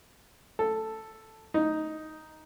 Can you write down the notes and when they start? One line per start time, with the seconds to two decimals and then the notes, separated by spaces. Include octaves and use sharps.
0.59 A4
1.54 D#4